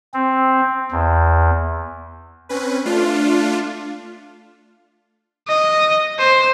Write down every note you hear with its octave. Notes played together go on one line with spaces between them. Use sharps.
C4
E2
C4 C#4 B4
A3 D4 F4
D#5
C5